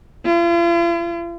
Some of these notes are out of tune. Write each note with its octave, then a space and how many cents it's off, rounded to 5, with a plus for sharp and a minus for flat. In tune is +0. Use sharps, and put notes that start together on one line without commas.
F4 -45